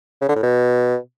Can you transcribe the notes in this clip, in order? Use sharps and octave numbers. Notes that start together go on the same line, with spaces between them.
C#3
D3
A2
B2